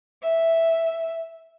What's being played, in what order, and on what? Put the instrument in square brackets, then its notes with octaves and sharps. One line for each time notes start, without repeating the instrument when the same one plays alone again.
[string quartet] E5